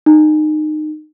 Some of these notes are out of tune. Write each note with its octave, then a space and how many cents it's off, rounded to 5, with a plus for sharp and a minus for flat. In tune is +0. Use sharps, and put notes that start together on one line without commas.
D#4 -25